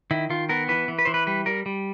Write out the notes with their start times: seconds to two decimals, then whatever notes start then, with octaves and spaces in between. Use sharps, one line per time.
0.11 D#3 E4
0.30 D#3 F4
0.49 B3 A#4
0.68 E3 B4
0.88 E3
0.99 B4
1.05 E3 C5
1.14 B4
1.27 G3 B4
1.46 G3 A#4
1.66 G3